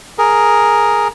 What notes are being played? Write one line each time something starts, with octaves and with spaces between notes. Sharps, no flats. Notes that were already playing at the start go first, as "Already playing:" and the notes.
G#4 A#4